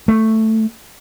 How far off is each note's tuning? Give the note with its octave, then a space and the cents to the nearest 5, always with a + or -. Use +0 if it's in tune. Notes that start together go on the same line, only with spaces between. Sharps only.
A3 +5